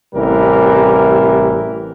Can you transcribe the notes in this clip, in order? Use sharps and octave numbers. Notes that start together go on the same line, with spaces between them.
A1 C3 E3 G3 A#4